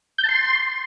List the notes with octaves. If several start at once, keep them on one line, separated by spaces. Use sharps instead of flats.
G6
A5
C6